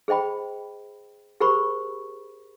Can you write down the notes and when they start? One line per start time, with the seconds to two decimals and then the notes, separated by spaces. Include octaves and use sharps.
0.08 G#4 C5 D#5 G5 B5
1.40 G4 G#4 A#4 C5 B5 C#6